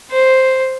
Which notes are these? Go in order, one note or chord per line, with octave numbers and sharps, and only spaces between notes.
C5